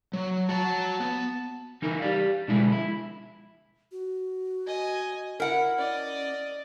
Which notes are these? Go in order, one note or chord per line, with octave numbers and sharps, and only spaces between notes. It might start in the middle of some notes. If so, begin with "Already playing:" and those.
F#3
F#4 F#5 A5 A#5
B3
E3 D#4 E4 A#4
G4 D5 F5
B2 D3 F3 G#3 E4
E4
F#4
D#5 G#5
E4 A#4 F#5
C#4 D5 D#5